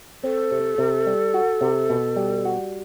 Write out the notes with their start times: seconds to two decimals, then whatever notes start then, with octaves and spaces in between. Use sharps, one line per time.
0.23 C4 A4
0.51 C3
0.78 C3
1.07 G3
1.34 F#4
1.61 C3
1.90 B2
2.16 G3
2.45 F#4